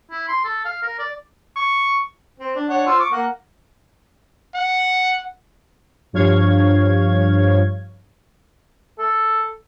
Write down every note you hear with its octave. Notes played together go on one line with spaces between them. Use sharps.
E4
C6
A4
F5
A#4
D5
C#6
C4
D4
D4 C#5 F#5
F4 C5 E6
C#6 D6
A#3 F#5
F#5
G2 F3 C#5 F5 G#6
A4